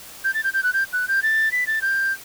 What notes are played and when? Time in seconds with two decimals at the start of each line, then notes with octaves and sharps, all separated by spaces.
0.24 G6
0.34 A6
0.44 G6
0.54 G6
0.63 F#6
0.73 G6
0.93 F#6
1.08 G6
1.23 A6
1.52 B6
1.67 A6
1.82 G6